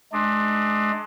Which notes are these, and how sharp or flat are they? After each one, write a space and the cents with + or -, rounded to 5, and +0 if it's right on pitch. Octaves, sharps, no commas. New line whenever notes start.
G#3 +35 D4 +30